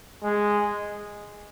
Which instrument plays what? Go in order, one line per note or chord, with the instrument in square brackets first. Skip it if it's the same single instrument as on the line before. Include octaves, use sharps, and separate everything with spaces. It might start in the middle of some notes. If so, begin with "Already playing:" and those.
[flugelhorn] G#3